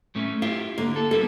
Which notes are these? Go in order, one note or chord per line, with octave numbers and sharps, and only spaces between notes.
A2 A3 C#4
E4 F4 G4 F5
D3 A#3
A4
G3 A#3 B3 A4